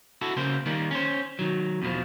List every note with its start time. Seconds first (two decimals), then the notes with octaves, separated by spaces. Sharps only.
0.21 E4 F#4 A4
0.37 C#3 A#3 C5
0.66 D#3 G3 A#3
0.91 C#4 C5
1.39 D#3 F#3
1.82 E2 B2 F3